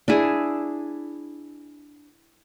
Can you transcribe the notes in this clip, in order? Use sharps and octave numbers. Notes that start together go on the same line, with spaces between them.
D4 E4 G#4